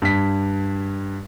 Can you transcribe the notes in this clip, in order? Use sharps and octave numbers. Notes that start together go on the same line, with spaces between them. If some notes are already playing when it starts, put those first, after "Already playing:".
G2 B6